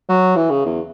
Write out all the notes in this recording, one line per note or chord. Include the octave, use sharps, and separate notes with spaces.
F#3
E3
C#3
E2